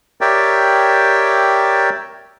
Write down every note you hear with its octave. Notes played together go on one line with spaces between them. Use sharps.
G4 A#4 C#5 D5 E5 G5